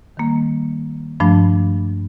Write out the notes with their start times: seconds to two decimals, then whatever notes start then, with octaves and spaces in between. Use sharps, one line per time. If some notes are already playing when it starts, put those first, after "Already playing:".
0.17 D#3 G3 A#3
1.20 G2 F3 A3 D4